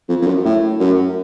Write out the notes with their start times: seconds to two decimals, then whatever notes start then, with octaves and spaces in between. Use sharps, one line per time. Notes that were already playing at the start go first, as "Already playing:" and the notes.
0.09 F2
0.22 F2
0.27 F#2
0.45 A2
0.80 F#2